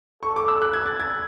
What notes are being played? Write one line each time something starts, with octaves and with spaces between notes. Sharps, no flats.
A4 C#6
D6
E6
F#6
G#6
A6
G#6